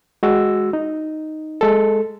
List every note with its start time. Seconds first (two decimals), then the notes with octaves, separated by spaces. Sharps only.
0.23 G#3 F#4 E6
0.73 D#4
1.61 G#3 A4